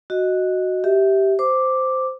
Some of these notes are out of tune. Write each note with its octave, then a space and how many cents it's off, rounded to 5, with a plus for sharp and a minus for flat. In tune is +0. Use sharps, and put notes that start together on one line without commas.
F#4 +0 D#5 +0
G4 -10 E5 -15
C5 -10 D6 +0